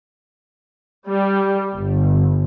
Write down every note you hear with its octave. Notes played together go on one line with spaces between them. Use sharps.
G3
G1